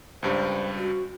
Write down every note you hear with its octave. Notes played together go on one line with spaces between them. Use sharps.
C#2 G2 G3 C5
F#4